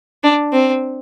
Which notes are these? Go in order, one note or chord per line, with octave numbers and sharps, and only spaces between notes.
D4
C4